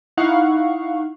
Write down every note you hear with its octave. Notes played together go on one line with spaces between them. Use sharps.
D#4 E4 F5 F#5 C#6